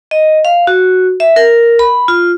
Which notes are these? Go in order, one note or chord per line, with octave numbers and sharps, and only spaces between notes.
D#5
F5
F#4
E5
A#4
B5
F4